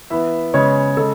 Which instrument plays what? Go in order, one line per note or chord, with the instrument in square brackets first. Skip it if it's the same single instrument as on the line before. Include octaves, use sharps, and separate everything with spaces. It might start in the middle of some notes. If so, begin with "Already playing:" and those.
[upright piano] E3 B3 E5
C#3 G#3 B3 C#5
C#3 G#3 A4